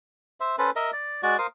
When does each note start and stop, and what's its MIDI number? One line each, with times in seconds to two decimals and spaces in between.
0.40 0.56 72
0.40 0.56 76
0.58 0.70 61
0.58 0.70 69
0.58 0.70 71
0.58 0.70 72
0.76 0.91 70
0.76 0.91 75
0.76 0.91 76
0.93 1.22 74
1.23 1.37 56
1.23 1.37 66
1.23 1.37 74
1.38 1.47 70
1.38 1.47 72
1.38 1.47 77
1.38 1.47 87